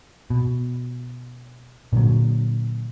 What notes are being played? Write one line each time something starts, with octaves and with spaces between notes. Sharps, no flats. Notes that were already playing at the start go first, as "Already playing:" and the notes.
B2
A#2 D3 F#3